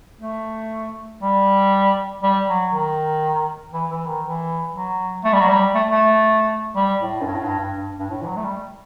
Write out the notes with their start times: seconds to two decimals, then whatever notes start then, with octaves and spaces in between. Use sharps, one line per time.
0.21 A3
1.22 G3
2.23 G3
2.48 F#3
2.73 D#3
3.74 E3
3.91 E3
4.07 D#3
4.25 E3
4.74 F#3
5.25 A3
5.33 G3
5.41 F#3
5.48 G3
5.75 A3
5.91 A3
6.76 G3
7.01 A2
7.21 F#2
7.26 G2
7.35 A2
7.43 G2
7.59 G2
7.77 G2
7.99 G2
8.10 A2
8.22 E3
8.27 F#3
8.37 A3
8.44 G3